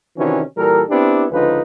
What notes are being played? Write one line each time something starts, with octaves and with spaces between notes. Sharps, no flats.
C3 D#3 E3 C#4 D4 F#4
A#2 E3 G3 A4 A#4
B3 C4 D4 E4 G4
C#2 D3 F3 D#4 F4 B4